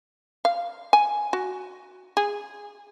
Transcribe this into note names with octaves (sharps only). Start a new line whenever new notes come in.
F5
G#5
F#4
G#4